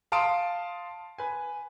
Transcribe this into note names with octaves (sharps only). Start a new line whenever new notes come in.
F5 A5 C6 D#6 D7
B4 G#5